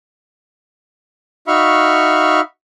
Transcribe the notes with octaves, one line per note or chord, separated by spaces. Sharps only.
D#4 F#4 E5 F5 B5 C#6